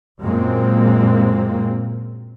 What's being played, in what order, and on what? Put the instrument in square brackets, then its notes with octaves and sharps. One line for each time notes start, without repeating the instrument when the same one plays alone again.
[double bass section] F#2 A#2 G#3 A#3 C4